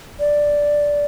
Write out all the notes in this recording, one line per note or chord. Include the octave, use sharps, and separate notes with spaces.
D5